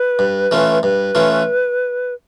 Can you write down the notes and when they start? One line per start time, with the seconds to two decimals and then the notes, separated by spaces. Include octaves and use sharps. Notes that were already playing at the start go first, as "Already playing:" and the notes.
Already playing: B4
0.19 G2
0.51 E3 A3 C#4 F4
0.83 G2 B4
1.15 E3 A3 C#4 F4